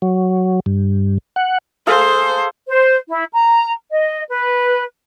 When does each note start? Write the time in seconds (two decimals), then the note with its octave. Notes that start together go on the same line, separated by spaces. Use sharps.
0.02 F#3
0.66 G2
1.36 F#5
1.87 G#4 A4 C5 F5
2.68 C5
3.08 E4
3.32 A#5
3.91 D#5
4.29 B4